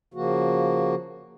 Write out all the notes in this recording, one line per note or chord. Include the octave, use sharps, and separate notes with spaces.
C#3 F3 A#3 F#4